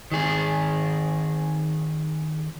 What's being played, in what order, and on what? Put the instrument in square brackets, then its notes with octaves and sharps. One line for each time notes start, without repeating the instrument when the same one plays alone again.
[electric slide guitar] D#3 G#4